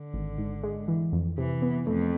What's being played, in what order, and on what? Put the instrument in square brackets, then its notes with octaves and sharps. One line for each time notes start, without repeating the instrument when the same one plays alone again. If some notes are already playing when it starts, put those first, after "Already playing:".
Already playing: [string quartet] D3
[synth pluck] G#1
G#2
G#3
E3
F2
[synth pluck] C3 [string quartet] E3
[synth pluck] B3
[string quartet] F2 [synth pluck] A3